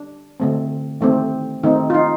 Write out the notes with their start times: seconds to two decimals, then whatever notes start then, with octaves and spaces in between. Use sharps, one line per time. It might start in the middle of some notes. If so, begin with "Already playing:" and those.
Already playing: D4
0.40 D3 A3 C4
1.01 D#3 A3 C4
1.63 D#3 A3 C4 D#4
1.90 F4
1.94 D#4